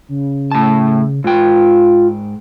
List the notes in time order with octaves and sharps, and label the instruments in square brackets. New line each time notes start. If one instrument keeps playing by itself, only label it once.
[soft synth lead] C#3
[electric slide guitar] A2 A5
[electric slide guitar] G#2 G5 [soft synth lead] F4